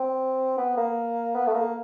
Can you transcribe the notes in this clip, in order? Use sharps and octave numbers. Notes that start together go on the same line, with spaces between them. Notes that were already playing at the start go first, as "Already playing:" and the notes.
Already playing: C4
B3
A#3
B3
A3
A#3